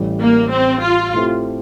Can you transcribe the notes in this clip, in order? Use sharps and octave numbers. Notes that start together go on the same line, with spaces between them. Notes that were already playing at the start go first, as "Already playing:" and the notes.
Already playing: A1 A2 G3
A#3
C4
F4
A2 A3 C4 G4